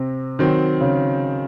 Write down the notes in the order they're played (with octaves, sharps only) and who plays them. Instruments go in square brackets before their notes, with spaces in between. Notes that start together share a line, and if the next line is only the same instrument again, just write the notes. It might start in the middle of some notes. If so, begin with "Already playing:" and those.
Already playing: [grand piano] C3 C4
[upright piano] D#3 F#3 C4
[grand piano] C#3 C#4